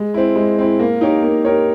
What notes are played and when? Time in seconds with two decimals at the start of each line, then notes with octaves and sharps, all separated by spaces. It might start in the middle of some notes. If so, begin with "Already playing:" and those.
Already playing: G#3
0.14 C4 E4
0.36 G#3
0.58 C4 E4
0.79 A#3
1.01 D#4 G4 A#4 C#5
1.23 A#3
1.45 D#4 G4 A#4 C#5